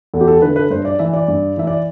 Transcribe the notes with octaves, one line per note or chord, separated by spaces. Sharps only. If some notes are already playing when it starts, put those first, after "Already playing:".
E2 A4
G4
A4
D3 B4
B4
G2 C5
D5
E3 E5
D5
G2
E3 E5
D5